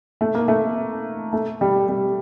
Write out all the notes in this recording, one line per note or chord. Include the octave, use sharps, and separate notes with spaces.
A3
A#3
A3
A3
G3
G3